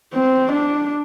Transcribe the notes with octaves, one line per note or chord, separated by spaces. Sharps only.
C4
D4